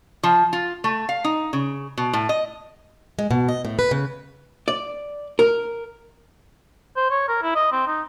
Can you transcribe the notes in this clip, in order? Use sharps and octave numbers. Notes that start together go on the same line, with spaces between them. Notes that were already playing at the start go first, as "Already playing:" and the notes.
F3
F4
A3
F5
D#4
C#3
B2
A2
D#5
G#3
B2
D#5
A2
B4
C#3
D5
A#4
C5
C#5
A#4
E4
D#5
C4
D#4